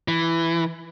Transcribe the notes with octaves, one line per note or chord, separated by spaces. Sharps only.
E3